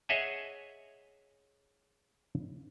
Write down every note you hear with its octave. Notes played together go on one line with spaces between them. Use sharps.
G#4 C#5 D#5 E5 F#5 G#5